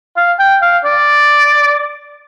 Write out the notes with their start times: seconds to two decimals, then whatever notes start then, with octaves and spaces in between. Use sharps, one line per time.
0.17 F5
0.40 G5
0.62 F5
0.85 D5